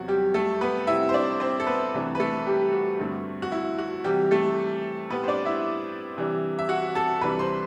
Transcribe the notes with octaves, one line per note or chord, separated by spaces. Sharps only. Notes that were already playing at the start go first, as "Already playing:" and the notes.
Already playing: E2 C3 F#3 F#4
G3 G4
A3 A4
B3 B4
C3 G3 C4 E4 E5
C5
D4 D5
C4 C5
A4
B3 B4
C2 C3 E3 A3 D4
B4
A3 A4
G3 G4
F#4
G2 D3 A3 C4
F#4
E4
F#4
C3 E3 G3 G4
A3 A4
A2 G3 B3 C4 B4
C5
D4 D5
E4 E5
C3 E3 G3 D4
E5
F#4 F#5
A4 A5
C2 C3 E3 G3 D4 B4 B5
C5 C6